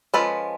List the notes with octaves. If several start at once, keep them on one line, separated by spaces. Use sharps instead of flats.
F3 G#3 C#4 A4 B4